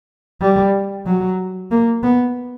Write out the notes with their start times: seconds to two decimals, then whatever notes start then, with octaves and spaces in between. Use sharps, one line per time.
0.41 G3
1.06 F#3
1.71 A#3
2.03 B3